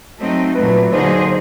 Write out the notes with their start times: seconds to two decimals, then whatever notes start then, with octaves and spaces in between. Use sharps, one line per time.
0.18 F#3 A3 C4 D#4
0.55 A#2 F#3 A3 B4
0.92 D3 F#3 A#3 D#4 G#4 C5
1.19 C5